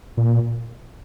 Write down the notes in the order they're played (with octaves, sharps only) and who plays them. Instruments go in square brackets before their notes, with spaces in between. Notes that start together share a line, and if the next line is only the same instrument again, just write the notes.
[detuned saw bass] A#2